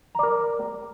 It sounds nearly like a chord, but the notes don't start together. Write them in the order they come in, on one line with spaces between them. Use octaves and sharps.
A#5 D5 A#4